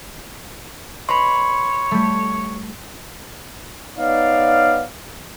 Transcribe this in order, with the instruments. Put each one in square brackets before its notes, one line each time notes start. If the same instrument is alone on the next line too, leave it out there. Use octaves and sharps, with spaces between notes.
[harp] B4 D#5 [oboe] C#5 [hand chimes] B5 C6
[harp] G3 A3
[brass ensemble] B3 D#4 C#5 D5 F5